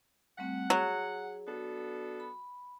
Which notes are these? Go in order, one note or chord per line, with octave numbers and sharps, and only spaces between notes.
G3 A3 C4 F#5
F#3 G#4
B3 D4 F#4 A4
B5